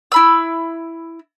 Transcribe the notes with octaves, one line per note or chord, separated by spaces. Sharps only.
E4 B5 E6